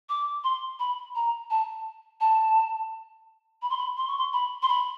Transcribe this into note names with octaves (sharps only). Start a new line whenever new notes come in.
D6
C6
B5
A#5
A5
A5
B5
C6
B5
C6
C#6
C6
B5
C6
B5